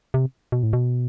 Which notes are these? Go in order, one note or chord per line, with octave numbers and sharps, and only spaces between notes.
C3
B2
A2
B2